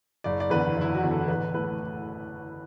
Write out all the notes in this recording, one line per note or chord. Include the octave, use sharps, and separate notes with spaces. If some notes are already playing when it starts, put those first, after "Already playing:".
F#1 D5
D5
E2 D3 B4
F#1 E4
F#4
E2 D3
A4
A1 B4
A2 A3 B4